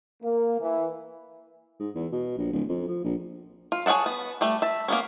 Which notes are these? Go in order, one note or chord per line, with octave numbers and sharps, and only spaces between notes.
A#3
E3
G#2
E2
B2
A#1
D1
F2
F3
A#1
F4
G#4 C#5 E5 F#5 A5
B3
G3 A3
E5 A5
A#3 B3 C#4